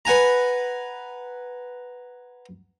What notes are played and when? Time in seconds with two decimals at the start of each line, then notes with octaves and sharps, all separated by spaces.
0.05 B4 F#5 G#5 A#5